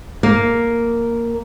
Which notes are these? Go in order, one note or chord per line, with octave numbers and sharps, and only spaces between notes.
A#3